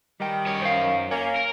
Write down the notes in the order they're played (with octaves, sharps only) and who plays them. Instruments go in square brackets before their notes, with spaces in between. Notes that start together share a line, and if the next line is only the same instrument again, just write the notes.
[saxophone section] D#3 [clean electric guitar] G3 G5
[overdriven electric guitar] F#2 C#5
[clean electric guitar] C5 F5
[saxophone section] A#3 [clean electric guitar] C#5 G#5
[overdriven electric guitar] A#4